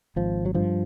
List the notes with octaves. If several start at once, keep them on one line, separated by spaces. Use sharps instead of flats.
G#1 F3
F#3
G2 F3